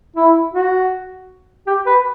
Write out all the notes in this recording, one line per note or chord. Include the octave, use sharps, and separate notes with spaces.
E4
F#4
G4
B4